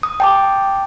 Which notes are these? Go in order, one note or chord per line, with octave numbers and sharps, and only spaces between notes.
D#6
G5 A5 D6